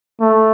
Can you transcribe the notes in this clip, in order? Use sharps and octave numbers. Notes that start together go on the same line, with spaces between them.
A3